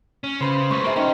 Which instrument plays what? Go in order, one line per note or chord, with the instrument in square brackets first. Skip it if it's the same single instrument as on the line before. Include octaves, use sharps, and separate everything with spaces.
[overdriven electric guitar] C#4
[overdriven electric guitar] C#3 [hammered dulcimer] B4 C5
[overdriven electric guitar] G#3 B4 [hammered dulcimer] C#6
[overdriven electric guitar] A#3 G#4 [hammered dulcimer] A#4 C5 E5
[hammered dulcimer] D#3 [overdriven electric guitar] C#4